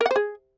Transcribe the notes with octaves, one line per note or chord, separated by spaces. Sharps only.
A#4
F#5
C5
G#4